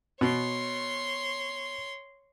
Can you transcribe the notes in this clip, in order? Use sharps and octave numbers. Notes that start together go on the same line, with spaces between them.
B2 C#5 C6